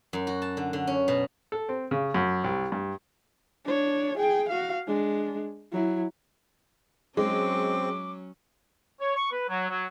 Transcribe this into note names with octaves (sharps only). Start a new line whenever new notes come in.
F#2
F#4
A5
D3
D3
C#4
B2
A4
C4
C#3
F#2
C2
G2
D4 C#5
G#4 G5
F#4 F5
G#3 D4
F#3 E4
F#3 G#3 C4 C#4 D6
C#5
C#6
B4
F#3
F#3